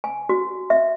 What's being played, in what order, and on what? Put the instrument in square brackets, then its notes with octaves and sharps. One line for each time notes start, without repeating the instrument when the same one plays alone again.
[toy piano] G#5
F#4
E5